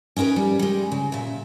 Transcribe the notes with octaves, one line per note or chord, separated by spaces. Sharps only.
C#4 D#4 E4 A#4 B4
G3
G3 G#3
C#3
A#2 E5